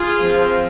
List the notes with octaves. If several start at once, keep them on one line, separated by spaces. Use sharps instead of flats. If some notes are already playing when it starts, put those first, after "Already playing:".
Already playing: F4 G#4
F3 C4